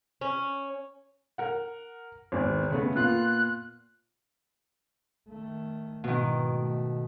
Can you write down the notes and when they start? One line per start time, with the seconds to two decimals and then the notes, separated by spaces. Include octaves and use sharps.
0.21 C#4
1.38 A#4 F#5
2.32 G#1 E2
2.70 C#3 A3 B3
2.95 A#2 B3 F4 F#6
5.28 D#3 A3
6.04 G#2 B2 D#3 E3
6.53 A3